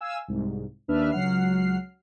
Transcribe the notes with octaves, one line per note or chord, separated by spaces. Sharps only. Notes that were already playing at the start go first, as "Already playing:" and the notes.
F5 G#5 E6
C2 G#2
D#2 D4 B4 E5 F6
C#2 F#3 F#5 F6 C7